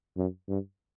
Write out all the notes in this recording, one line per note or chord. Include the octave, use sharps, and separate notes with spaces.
F#2
G2